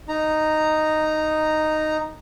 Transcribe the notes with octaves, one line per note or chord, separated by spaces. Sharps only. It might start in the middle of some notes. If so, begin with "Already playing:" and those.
D#4 A#5